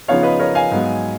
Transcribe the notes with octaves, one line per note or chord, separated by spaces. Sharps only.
C#3 F3 B3 D#4 C#5 F5
B4 D#5
A#4 C#5
F5 G#5
G#2 F#3 B3